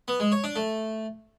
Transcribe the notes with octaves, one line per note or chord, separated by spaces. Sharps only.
B3
G#3
C#5
D4
A3